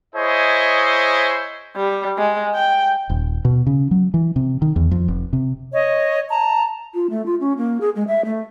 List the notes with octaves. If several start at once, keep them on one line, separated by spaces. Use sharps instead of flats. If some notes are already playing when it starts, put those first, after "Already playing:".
E4 G#4 C5 C#5 D#5
G3
G#3
G5
D#1
B2
C#3
F#3
E3
C3
D#3
E2
F2
F1
C3
C#5 D#5
A5 A#5
F4
A3
F4
C#4
A#3
G#4
G#3
E5
A3